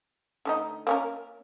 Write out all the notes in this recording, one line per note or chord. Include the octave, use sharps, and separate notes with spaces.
D3 A3 D#4
A#3 C#4 A#4